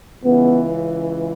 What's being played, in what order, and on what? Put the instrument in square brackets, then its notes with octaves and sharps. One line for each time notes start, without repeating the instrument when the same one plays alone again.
[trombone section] C#2 C#3 E3 [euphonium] B3